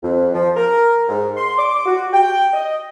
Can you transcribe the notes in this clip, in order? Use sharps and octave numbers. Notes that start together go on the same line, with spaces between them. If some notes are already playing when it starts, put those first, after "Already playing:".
F2
F3
A#4
G#2
C6
D6
F#4
G5
D#5